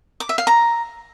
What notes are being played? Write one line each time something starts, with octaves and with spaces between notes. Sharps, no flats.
D6
E5
F5
A#5